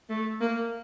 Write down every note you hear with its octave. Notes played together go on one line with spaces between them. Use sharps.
A3
A#3